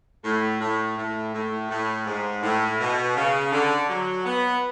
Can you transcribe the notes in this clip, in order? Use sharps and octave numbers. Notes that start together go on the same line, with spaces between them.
A2
A2
A2
A2
A2
G#2
A2
B2
C#3
D3
F#3
B3